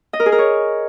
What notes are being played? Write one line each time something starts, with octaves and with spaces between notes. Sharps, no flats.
D#5
A#4
G#4
A#4
C#5